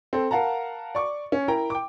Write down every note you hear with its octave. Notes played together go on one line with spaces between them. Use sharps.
C4 A4
A#4 F5 F#5 A5 A#5
D5 C#6 D6
C#4
E4 A#4 G5 A#5
G5 D6